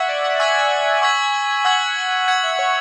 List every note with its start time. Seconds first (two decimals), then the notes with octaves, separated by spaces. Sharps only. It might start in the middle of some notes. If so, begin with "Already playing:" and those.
Already playing: E5 F#5 C#6 E6 G#6 B6 F#7
0.08 D5
0.24 F#5
0.40 G#5 C#6 E6 G#6 B6 F#7
1.02 C#6 E6 G#6 B6 F#7
1.64 F#5 C#6 E6 G#6 B6 F#7
1.96 G#5
2.28 F#5 G#6 C#7 F#7
2.43 E5
2.59 C#5